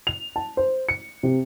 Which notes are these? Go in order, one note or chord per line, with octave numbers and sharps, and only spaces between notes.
F7
A5
C5
C#7
C3